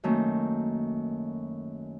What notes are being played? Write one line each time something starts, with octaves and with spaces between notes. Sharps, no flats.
F#2 D#3 A3 A#3 C#4